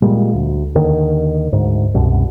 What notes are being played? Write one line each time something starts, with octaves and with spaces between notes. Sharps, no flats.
A#2 G3 G#3
D2
D#2 D3 D#3
D2 G#2
C2 F#2 B2